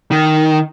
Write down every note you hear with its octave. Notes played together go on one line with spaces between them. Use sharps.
D#3